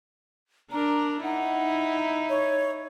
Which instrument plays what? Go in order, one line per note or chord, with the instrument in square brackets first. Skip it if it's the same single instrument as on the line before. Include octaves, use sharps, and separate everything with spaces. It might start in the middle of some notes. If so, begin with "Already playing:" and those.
[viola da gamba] D4 A#4 [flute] A#5
[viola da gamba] D#4 E4 [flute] F#5
[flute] C#5